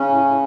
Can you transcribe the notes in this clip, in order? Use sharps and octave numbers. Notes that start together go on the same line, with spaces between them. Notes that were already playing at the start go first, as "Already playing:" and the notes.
Already playing: C#3 C#4
A2
A2